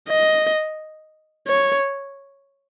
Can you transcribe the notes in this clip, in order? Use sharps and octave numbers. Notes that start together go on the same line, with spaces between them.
D#5
C#5